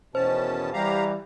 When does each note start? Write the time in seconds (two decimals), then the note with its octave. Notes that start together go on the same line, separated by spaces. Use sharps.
0.15 E2 B2 D#3 C#4 C5 A5
0.73 E3 G3 G4 F5 A#5